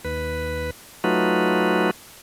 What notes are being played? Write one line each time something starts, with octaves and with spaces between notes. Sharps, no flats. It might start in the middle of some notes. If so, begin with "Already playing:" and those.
D#2 B4
F#3 A3 D#4 F4 F#4 B4